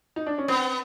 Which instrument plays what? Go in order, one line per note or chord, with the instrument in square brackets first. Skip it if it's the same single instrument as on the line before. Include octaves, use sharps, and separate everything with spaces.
[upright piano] D#4
D4
C#4
[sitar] B3 [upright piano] C4